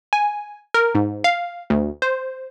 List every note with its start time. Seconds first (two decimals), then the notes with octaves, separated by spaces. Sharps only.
0.13 G#5
0.74 A#4
0.95 G#2
1.24 F5
1.70 D2
2.02 C5